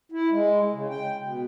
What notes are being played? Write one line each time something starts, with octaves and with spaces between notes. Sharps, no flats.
E4
G#3
C#3
G5
B2